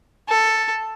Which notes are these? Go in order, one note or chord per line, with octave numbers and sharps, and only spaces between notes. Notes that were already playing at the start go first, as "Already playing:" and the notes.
A4